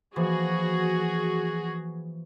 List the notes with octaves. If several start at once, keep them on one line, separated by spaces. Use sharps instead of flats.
E3 F3 A#3 F#4 G#4